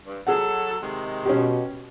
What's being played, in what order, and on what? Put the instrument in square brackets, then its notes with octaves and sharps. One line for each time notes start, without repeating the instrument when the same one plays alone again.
[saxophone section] G2
[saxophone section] F#3 A4 [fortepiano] G#4 F#5
[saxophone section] C3 D#3 G#3
[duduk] B2 [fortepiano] C#4 G4